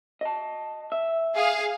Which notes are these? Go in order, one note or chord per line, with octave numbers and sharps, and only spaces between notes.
D#5 A5
E5
G#4 F5